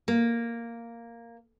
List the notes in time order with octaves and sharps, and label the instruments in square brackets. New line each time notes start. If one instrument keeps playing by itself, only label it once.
[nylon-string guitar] A#3